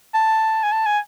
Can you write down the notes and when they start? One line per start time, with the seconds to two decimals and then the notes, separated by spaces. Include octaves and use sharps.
0.14 A5
0.63 G#5
0.72 A5
0.86 G#5